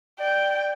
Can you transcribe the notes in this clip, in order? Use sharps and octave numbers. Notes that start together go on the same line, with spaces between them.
D5 G5